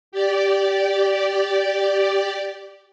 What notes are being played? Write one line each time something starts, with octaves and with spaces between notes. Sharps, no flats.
G4 D5